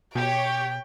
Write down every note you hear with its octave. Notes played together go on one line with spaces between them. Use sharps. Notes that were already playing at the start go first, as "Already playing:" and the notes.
B2 G4 C#5 G5